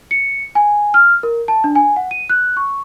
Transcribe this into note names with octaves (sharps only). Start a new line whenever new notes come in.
C#7
G#5
F6
A#4
A5
D4
G#5
F#5
D#7
F#6
C#6